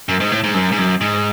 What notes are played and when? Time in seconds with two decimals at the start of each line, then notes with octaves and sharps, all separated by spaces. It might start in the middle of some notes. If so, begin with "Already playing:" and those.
0.09 F#2
0.20 G#2
0.32 A2
0.44 G#2
0.54 F#2
0.72 G#2
0.78 F#2
1.01 G#2